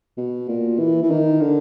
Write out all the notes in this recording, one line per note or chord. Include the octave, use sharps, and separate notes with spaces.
B2
A#2
E3
E3
D#3
D3